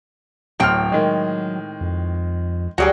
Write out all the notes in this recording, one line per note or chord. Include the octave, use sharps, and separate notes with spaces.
D1 A2 F#3 C4 G5 F6
D#3 G#3
F2
D2 F#3 G3 F#4 G#4 G5